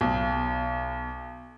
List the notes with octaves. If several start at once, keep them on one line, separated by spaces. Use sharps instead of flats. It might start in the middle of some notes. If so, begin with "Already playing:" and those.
B1